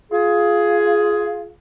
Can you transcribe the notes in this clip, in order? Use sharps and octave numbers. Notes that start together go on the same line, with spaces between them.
F4 G#4